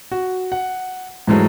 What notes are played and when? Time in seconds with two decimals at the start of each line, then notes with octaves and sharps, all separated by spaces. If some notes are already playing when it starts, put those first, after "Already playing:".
0.12 F#4
0.52 F#5
1.27 G#2 E3 F#3 G#3 A3